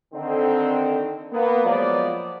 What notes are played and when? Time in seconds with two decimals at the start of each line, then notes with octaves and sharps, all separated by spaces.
0.14 D3 D#3 C4
1.33 A#3 B3
1.65 F3 F#3 G#3 A#3 B3 D5